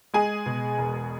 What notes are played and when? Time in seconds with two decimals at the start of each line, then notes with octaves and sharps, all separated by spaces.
0.14 G#3 G#4 G#5
0.46 B2
0.78 E1